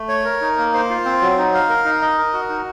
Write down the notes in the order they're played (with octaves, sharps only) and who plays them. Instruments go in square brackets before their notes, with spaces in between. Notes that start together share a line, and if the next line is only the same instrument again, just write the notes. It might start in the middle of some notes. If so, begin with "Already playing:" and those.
Already playing: [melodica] A3
C#5
A#4
D#4
A#3
C5
F4
C4
F#3
D#4
F5
A#4
D#4
D#5
A#4
F#4
D#4